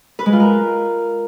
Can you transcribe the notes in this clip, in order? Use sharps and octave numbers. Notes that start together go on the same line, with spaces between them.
B4
G#3
F4
A#4